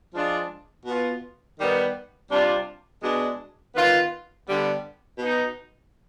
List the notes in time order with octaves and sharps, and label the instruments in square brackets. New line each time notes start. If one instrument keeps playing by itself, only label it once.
[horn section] F3 G#3 D4 F4
B2 B3 F4
D#3 G3 B3
C3 G3 D4 F4
B2 G#3 D4
D#3 B3 F4
D3 G3 B3
B2 B3 D#4